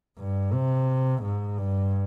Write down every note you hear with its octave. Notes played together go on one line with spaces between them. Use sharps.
G2
C3
G#2
G2